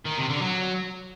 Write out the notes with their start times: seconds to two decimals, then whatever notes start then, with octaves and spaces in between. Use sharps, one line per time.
0.06 D#3
0.18 C3
0.30 D3
0.42 F#3